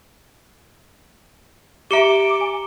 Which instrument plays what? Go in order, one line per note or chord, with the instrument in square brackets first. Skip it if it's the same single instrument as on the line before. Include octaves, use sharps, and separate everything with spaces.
[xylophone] G4 E5 [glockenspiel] A#5 C#7 G7 [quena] D6
[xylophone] G#5